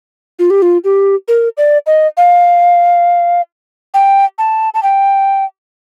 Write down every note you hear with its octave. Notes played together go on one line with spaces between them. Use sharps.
F4
G4
F4
G4
A#4
D5
D#5
F5
G5
A5
A5
G5